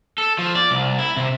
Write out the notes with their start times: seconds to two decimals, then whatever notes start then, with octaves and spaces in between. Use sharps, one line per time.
0.18 A4
0.38 F3
0.55 D5
0.71 C2
0.99 E4
1.17 C3